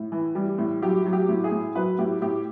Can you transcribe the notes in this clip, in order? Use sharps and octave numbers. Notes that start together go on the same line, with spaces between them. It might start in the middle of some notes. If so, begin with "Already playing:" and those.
Already playing: A2
E3
G3
A2
F#3 G4
F#3
G4
A2
G#4
A2
F#3 B4
A2 G4
A2 G4